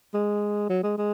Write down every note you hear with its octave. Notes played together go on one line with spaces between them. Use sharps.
G#3
F#3
G#3
G#3